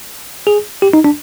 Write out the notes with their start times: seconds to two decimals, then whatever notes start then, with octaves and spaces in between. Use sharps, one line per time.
0.47 G#4
0.82 G4
0.93 D#4
1.04 D4